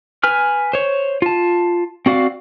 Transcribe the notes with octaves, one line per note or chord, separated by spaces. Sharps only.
B4 G#5 F6
C5 C#5
F4 A5
C4 F#4 D5 F5